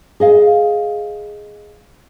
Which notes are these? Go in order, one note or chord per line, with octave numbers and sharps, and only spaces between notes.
G#4 D#5 F5